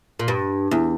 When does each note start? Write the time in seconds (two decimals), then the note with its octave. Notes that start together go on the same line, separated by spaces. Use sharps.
0.19 A#2
0.28 G2
0.71 E2